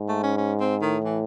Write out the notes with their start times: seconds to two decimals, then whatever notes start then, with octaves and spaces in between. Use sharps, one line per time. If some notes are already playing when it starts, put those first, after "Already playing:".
Already playing: G#2
0.09 A3
0.23 C#4
0.38 C#4
0.60 C4
0.82 A2 D#3
1.04 E3